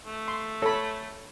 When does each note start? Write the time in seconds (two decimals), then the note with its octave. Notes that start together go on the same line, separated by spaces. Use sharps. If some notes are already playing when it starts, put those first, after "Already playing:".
0.07 A3
0.28 C6
0.62 A4 C#5 B5